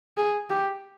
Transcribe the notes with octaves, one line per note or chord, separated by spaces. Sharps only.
G#4
G4